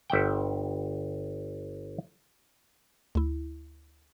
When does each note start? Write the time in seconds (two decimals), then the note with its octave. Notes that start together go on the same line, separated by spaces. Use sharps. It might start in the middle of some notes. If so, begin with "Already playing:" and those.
0.10 G1 E5 F#5 G5
3.15 D2 E4